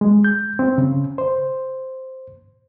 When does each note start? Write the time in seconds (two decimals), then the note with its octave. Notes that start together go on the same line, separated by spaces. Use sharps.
0.01 G#3
0.24 G6
0.59 C4
0.78 C#3
1.18 C5